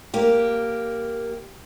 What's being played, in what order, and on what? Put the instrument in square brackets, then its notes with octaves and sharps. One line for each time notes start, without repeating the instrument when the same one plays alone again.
[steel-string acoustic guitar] A#3 G4